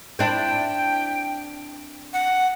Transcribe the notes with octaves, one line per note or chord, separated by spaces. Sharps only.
C4 D4 E4 G5
F#5